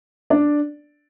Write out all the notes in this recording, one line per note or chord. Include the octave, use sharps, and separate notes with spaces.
D4 D5